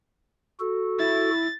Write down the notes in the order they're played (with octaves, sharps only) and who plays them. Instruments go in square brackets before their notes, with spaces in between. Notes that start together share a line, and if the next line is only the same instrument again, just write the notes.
[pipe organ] F#4 A4
[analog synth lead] E4 [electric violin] A6